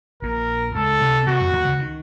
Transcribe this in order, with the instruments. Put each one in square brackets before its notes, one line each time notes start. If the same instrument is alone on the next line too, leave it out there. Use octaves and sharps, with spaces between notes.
[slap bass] A#1 A#2 [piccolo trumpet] A#4
[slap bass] C#2 C#3 [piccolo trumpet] A4
[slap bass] C3 C4
[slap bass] C3 C4 [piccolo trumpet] F#4
[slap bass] F2 F3
D#2 D#3
C#2 C#3
D#3